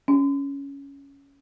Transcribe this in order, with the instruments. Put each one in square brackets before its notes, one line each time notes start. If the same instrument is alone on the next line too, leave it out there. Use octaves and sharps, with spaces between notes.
[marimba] C#4